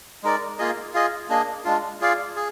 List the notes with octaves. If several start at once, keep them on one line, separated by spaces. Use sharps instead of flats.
G#3 D#4 A#4 D5
A#3 F4 G#4 D#5
F4 G#4 D#5
A#3 D4 G#4 D#5
G#3 D4 F4
F4 G#4 D5 F5
G#4